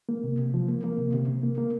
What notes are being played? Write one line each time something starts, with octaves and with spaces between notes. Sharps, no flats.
A#3
C3
C3
F3
A#3
A#3
C3
C3
C3
A#3
A#3